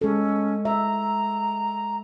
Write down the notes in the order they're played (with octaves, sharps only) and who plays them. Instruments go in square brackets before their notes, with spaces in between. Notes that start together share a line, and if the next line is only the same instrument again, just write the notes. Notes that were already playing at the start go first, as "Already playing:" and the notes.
[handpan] G#3 A4 [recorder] C#4
[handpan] E5 [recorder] A#5